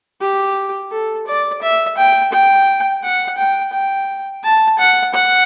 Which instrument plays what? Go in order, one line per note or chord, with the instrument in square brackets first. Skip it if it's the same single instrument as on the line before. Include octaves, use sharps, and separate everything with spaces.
[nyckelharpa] G4
A4
D5
E5
G5
G5
F#5
G5
G5
A5
F#5
F#5